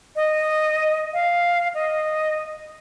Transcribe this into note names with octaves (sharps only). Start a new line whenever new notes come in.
D#5
F5
D#5